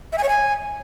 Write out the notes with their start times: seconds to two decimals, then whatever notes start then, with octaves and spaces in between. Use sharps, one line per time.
0.12 E5
0.18 G#5
0.23 C#5
0.29 G#5